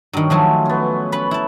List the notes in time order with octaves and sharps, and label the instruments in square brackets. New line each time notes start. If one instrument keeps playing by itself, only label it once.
[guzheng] G2 D#3 [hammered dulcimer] F#3
[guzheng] D#3 F3 F#3 [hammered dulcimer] A3 C5 G#5
[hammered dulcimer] B3 C#4
[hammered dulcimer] C#4 [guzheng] B4 B5
[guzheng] E4 A5